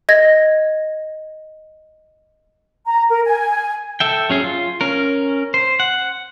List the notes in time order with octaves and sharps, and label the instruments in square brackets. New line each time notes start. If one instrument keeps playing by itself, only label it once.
[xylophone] D#5 G#6 A#6
[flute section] A#5
A#4
G#5
[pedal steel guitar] A4 E5 G5
F#3 C#4 G#4
F4
C#4 A#4
C5
F#5